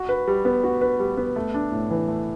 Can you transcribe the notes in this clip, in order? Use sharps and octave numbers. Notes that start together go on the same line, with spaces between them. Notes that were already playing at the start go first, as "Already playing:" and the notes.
Already playing: F#4
B4
G3
B3
F#4
B4
G3
B3
A3
D4
A2
E3
A3